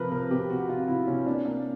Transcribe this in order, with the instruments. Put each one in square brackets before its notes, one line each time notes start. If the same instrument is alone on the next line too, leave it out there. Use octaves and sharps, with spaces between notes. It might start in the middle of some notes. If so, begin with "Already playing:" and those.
Already playing: [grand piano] C3 F3 A#4 B4
C3 A#4
C3 G4
C3 F#4
C3 F4
C3 E4
C3 C#4
A#3 D4
A#3